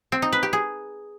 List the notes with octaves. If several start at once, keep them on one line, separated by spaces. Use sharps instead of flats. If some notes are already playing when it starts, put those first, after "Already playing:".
C4
D#4
B4
G4
G#4